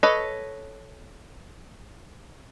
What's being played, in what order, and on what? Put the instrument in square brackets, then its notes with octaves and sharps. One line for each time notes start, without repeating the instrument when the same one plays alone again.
[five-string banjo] A4 B4 C#5 D#5